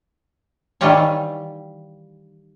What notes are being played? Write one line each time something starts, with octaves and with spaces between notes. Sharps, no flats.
D#3 E3 G3 F4 G4 C#5